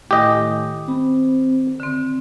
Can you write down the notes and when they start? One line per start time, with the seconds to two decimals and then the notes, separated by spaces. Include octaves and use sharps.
0.11 A2 D#3 G4 D#5 G#5
0.88 C4 B5
1.80 D3 C4